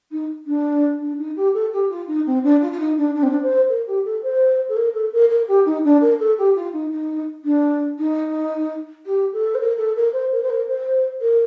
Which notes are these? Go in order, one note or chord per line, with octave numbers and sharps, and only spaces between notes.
D#4
D4
D4
D#4
G4
A4
G4
F4
D#4
C4
D4
F4
F4
D#4
D4
D4
C4
D4
C5
A#4
G4
A4
C5
A4
A#4
A4
A#4
A#4
G4
D#4
D4
A#4
A4
G4
F4
D#4
D#4
D4
D#4
G4
A4
C5
A#4
A4
A#4
C5
A#4
C5
A#4
C5
A#4